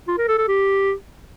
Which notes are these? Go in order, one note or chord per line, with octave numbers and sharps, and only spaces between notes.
F4
A#4
A4
A4
G4